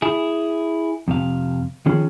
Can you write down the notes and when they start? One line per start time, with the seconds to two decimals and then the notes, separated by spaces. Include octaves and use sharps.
0.02 E4 G#4
1.08 F2 C3 F5
1.86 D#3 F3 C#4 G#4